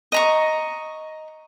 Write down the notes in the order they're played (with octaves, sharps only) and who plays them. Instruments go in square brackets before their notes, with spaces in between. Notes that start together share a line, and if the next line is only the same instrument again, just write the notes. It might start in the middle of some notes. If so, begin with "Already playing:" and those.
[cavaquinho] D#5 A#5 C#6